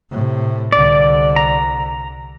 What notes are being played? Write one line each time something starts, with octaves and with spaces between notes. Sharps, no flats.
A2 C3
C2 D3 D5
A#5